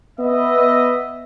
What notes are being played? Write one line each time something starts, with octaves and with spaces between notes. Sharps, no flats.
B3 D#5 E5